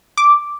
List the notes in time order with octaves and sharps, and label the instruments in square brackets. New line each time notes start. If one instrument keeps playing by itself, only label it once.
[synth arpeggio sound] D6